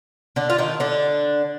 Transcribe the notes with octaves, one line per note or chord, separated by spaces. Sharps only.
D3 D4
F4
D#3 D#4
D3 D4